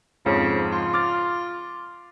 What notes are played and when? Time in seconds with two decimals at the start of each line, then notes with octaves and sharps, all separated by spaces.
0.26 F2 G#2 C#3 F3
0.72 F4
0.94 D6 F6 A6